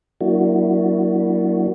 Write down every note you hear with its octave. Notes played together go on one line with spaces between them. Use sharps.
F#3 A#3 D4 E4 F#4